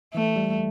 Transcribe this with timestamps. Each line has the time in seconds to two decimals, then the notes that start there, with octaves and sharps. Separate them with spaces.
0.15 E3 A3
0.36 G3